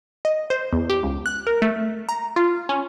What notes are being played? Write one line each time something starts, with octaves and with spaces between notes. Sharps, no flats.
D#5
C5
E2
G4
C#2
F#6
A#4
A3
A#5
F4
C#4